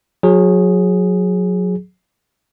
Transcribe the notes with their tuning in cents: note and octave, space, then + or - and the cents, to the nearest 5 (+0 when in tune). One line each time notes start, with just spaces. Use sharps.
F#3 -25 G#4 +0